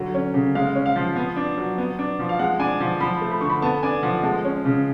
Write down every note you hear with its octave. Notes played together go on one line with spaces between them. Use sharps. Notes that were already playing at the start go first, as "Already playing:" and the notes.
Already playing: D3 F#3
C#4
C#3
G#3 F5
C#4
F5
F3
B3
D4
F#3
B3
D4
F3
F5
G#3 F#5
D4 G#5
F3
F3 B5
A3
B5
D3 C#6
B5
B3 A5
D4 G#5
F3 F#5
G#3 A5
C#4
C#3